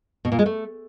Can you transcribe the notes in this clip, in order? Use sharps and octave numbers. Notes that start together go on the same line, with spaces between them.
B2
A#2
G#3
A3